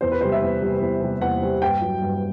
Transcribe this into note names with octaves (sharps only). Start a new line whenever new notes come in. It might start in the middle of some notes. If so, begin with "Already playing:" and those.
E2 C5
B4
C3 G3 C5
E5
E2
C3 G3
E2
C3 G3
E2 F#5
C3 G3
G2 G5
F#3
G2